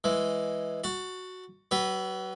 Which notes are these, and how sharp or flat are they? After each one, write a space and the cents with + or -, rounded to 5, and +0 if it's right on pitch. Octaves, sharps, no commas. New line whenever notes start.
E3 +0 G#3 +0
F#4 +0 A5 +25
F#3 +40 B4 +0